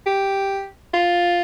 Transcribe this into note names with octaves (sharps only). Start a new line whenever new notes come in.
G4
F4